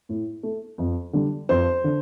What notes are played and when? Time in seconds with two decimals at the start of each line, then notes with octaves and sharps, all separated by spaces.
0.09 A2
0.43 A3
0.78 F2
1.13 D3 G3
1.49 F2 C5
1.84 D3